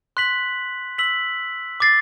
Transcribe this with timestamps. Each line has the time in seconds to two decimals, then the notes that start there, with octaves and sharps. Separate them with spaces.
0.17 C6 F#6 B6 F#7
0.98 E6 B6 F#7
1.80 D6 A6 C7